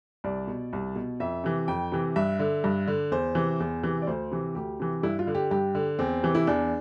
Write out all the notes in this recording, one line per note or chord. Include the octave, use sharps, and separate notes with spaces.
C2 D5
B2
C2
B2
F2 E5
C3 E3
F2 G5
C3 E3
G2 E5
D3
G2
D3
E2 C5
C3 E3
E2
C3 E3
D5
D2 C5
C3 E3
D2 G4
C3 E3
G2 E4
F4
D3
G4
G2 G4
D3
E2 C4
C3 E3
E4
E2 D4